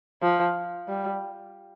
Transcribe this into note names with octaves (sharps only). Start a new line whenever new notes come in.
F3
G3